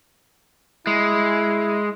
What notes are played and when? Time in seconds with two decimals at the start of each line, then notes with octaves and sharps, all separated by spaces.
0.87 G#3 E4